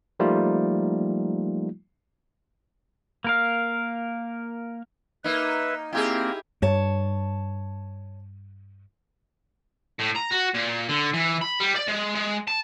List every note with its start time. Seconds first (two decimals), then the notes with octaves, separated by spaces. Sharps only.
0.20 F3 G3 A3 A#3 D#4 F4
3.24 A#3 A#4 F5
5.24 A#3 D#4 B4 E5
5.93 A#3 C4 E4 G4 G#4
6.62 G2 C#5 A5
10.00 A2
10.16 A#5
10.32 F#4
10.54 A#2
10.89 D3
11.14 E3
11.42 B5
11.60 G3
11.76 D5
11.88 G#3
12.15 G#3
12.48 A5